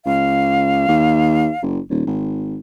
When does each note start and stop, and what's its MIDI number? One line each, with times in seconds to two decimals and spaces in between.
0.06 0.86 37
0.06 1.61 77
0.88 1.50 39
1.62 1.79 30
1.90 2.05 27
2.06 2.57 32